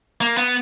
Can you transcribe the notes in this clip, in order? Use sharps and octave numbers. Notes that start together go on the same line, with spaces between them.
A#3
B3